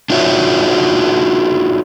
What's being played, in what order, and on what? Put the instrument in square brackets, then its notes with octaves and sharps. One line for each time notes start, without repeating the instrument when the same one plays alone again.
[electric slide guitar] D4 D#4 F4 F#4 C#5 E5